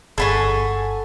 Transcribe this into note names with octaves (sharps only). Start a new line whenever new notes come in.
G1 G#4 A4 F#5 G#5 B5 C#6